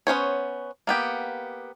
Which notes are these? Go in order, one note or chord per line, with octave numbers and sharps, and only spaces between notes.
B3 C#4 C5 C#5
A#3 B3 G4